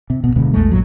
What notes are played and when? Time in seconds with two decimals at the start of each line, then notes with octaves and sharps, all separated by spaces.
0.10 C3
0.24 G#1 B2
0.36 D1 B2 D3 G#3
0.54 A#1 E2 G#3 A3
0.71 A#1 G2 A#2 F#3